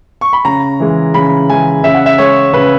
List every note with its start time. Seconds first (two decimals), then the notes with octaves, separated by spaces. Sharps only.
0.21 C#6
0.33 B5
0.45 C#3 A#5
0.80 E3 G#3
1.14 C#3 B5
1.49 E3 G#3 G#5
1.84 C#3 E5
1.95 F#5
2.06 E5
2.18 G#3 C#5
2.53 C#3 B4